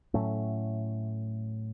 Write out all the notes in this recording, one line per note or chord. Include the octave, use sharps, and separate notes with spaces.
A2 F#3 A3 C#4